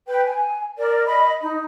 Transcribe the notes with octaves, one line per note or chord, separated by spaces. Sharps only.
B4 G5
G#5
A#4 D5
D#5 B5
D#4